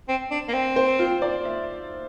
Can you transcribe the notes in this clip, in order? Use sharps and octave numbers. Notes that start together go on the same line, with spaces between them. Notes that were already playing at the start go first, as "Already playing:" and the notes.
C4
D4
A#3
C4
C5
F4
D5
E5